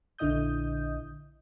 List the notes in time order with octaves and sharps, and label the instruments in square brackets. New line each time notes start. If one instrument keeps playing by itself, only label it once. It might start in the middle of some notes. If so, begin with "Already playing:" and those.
[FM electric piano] A#1 D3 E4 D#5 D#6 G6